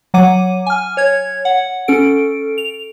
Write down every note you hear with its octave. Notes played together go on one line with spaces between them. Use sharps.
F#3 F#5 D6 D#7
G#5 F6
C#5 G#6
F#5
C#4 A4 D7
F7